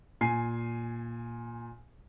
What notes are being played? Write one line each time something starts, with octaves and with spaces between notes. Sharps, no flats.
A#2 G#5 C7